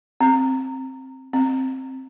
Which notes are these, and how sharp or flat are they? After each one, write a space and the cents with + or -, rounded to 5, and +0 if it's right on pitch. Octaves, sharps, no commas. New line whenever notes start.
C4 +10
C4 +10